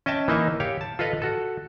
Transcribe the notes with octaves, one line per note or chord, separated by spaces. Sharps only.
C#4 D#5 E5 G5 A5
E3 A#3 D#4 D#5 E5
G4 C#5 F5
A5
F4 A4 B4 D#5 F5
F#4 A4